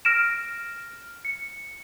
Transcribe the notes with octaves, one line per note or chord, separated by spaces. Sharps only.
F6 A#6 D7 E7
C#7